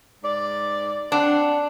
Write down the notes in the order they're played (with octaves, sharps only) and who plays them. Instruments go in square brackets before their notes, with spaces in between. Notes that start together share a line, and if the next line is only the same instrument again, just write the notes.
[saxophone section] G#2 D5
[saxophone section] C4 F#5 [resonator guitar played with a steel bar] D4